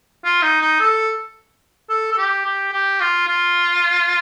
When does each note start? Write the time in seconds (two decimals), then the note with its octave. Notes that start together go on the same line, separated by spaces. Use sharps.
0.24 F4
0.42 D#4
0.61 D#4
0.80 A4
1.89 A4
2.12 A4
2.17 G4
2.45 G4
2.72 G4
3.01 F4
3.27 F4